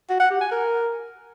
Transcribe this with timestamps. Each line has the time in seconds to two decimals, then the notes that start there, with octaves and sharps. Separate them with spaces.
0.10 F#4
0.20 F#5
0.31 G4
0.41 G#5
0.51 A#4